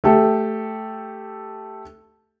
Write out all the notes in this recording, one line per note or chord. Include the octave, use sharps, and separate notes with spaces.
A3 G4 A4